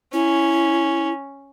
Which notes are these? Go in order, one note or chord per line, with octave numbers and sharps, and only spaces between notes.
C#4 E4